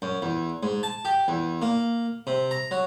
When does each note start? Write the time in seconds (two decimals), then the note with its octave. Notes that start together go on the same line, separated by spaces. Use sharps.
0.02 F#2
0.22 E2
0.63 G#2
0.83 A5
1.05 G4
1.28 E2
1.62 A#3
2.27 C3
2.51 A#5
2.71 F#3